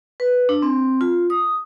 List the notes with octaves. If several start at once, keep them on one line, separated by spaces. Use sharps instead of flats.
B4
D4
C4
F4
D#6